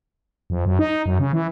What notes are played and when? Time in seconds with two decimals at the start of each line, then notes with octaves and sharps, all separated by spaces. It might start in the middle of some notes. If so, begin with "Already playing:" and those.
0.50 F2
0.66 F#2
0.79 D#4
1.06 F#2
1.19 C#3
1.33 E3